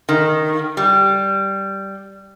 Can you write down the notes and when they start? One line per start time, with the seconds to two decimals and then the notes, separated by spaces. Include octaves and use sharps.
0.09 D#3
0.77 G3